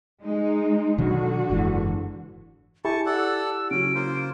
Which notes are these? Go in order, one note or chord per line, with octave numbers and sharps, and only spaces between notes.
G#3 D#4
B2 D3 D#3 F#3 F#4
F#1 G#2 E3
E4 G4 G#5 A5 C#6
A4 D5 F#5 E6
C#3 F#3 C#4 D7
A#3 F4 C5